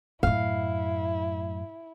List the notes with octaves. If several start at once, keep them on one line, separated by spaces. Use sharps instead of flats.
F#2 A2 E4 F5